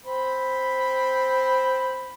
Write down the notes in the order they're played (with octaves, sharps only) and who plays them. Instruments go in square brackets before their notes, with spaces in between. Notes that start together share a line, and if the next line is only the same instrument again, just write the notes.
[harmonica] C4 C5 B5